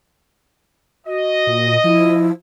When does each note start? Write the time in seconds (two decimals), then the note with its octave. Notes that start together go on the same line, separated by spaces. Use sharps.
1.07 F#4 D#5
1.47 A#2
1.84 F3 E4